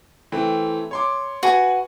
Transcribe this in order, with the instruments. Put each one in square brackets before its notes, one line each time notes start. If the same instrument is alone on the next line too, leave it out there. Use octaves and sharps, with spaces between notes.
[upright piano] E3 A3 C4
C#5 C6 D6
[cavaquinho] F#4 [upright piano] B4 G#5